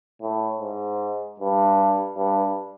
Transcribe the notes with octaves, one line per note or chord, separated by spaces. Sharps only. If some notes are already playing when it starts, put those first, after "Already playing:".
A2
G#2
G2
G2